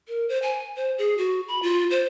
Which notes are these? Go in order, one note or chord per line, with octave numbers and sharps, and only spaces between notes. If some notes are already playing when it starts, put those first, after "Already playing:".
A#4
C5
G#5
C5
G#4
F#4
B5
F4
C5